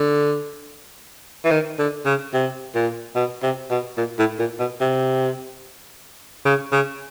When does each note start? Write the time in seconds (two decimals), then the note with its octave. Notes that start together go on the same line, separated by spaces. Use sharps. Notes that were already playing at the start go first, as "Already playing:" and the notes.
Already playing: D3
1.45 E3
1.51 D#3
1.79 D3
2.05 C#3
2.34 C3
2.75 A#2
3.16 B2
3.42 C3
3.70 B2
3.97 A#2
4.19 A2
4.39 A#2
4.60 B2
4.80 C3
6.45 C#3
6.72 C#3